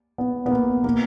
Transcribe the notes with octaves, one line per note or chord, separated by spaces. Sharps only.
B3
B3
A#3
A#3